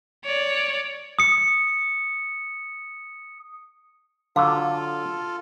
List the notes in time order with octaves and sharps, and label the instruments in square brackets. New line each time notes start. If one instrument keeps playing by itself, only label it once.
[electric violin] C#5 D5
[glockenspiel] D#6 C#7
[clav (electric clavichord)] D3 F#3 [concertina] F4 A4 [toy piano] F5